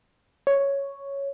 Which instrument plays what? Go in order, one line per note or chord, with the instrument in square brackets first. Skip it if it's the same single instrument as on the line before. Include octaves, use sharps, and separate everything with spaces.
[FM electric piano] C#5